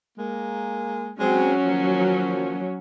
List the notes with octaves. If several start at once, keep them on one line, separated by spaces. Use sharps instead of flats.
G#3 A#3
F#3 G#3 C4 C#4
D#3 F3 A#3